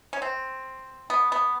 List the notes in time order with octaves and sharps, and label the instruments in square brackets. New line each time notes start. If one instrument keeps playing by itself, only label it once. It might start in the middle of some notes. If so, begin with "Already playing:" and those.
[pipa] C#4
C4
B3
B3